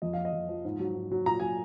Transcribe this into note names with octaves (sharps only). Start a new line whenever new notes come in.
F2 D#5
F3 F5
D#5
F2
F3
G#2
F#3
G#2
F#3
A#2 A#5
F#3 G#5